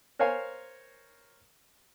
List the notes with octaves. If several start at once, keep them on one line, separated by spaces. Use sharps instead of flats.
A#4 C5 C#5 F5 G#5